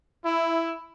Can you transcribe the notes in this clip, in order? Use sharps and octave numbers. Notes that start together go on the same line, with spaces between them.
E4